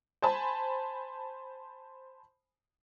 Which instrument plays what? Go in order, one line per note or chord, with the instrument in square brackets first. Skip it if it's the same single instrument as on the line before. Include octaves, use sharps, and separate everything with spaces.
[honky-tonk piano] C5 G#5 A5 B5